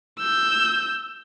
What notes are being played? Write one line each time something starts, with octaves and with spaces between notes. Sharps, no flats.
E6 G6